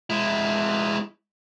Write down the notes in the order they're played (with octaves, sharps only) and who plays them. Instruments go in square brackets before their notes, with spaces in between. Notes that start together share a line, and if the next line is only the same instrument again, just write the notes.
[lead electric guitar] G#3 E4